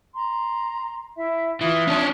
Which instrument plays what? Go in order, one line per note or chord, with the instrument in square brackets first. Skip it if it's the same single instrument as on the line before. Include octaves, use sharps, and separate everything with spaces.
[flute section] A#5 C6
E4 E5
[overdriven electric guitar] E3 [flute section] F4 E5 D#6
[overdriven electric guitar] C#4 D4